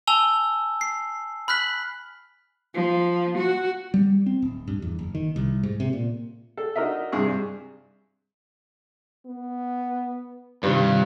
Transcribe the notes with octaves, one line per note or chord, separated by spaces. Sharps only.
G#5 A5 E6 F7 G7
C7
B5 F6 F#6 B6 F#7
F3
F#4
G3
C4
D1
G2
E2
F#1
D#3
C2
G#2
C3
A#2
A4
D4 D#4 F#4 A#4 D#5 E5
G2 C3 G#4 C#6
B3
G2 C3 D#3 D#4 F4 G4 B4